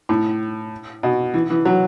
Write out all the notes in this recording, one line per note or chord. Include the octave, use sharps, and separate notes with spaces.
A2
B2
E3
E3
F#3